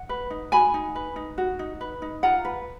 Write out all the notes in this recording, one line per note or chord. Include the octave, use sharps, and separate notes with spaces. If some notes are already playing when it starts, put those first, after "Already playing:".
Already playing: F#5
B4
D#4
F#4 G#5 B5
D#4
B4
D#4
F#4
D#4
B4
D#4
F4 F#5 A#5
B4